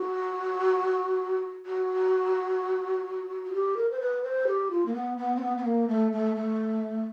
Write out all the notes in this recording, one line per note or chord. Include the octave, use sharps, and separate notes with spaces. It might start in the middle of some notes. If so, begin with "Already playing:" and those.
Already playing: F#4
F#4
F#4
G4
A#4
C5
B4
C5
G4
F4
A#3
B3
B3
C4
B3
B3
A#3
A3
A3
A3